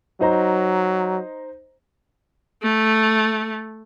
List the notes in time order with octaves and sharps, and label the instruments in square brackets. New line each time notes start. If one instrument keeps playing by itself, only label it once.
[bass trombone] F#3 [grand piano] D#4 C5 A#5
[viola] A3